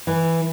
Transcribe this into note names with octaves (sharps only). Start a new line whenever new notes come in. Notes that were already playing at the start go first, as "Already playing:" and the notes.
E3